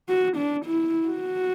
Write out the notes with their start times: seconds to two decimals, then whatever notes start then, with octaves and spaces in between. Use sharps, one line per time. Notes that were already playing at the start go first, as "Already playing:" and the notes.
0.09 F#4
0.37 D4
0.66 E4
1.08 F#4